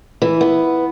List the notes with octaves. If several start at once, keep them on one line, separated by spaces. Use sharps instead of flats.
E3
B3